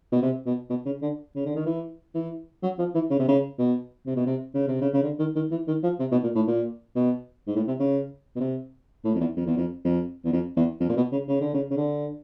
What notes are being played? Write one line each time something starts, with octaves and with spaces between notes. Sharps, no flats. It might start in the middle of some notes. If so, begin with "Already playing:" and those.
B2
C3
B2
B2
C#3
D3
C#3
D3
D#3
E3
E3
F#3
F3
E3
C#3
C3
C#3
B2
C3
B2
C3
C#3
C3
C#3
C#3
D3
D#3
D#3
E3
D#3
F3
C3
B2
A#2
A2
A#2
B2
G#2
A2
C3
C#3
B2
C3
A2
F2
E2
F2
E2
F2
F2
E2
F2
E2
F2
A#2
B2
C#3
C#3
D3
C#3
C#3
D3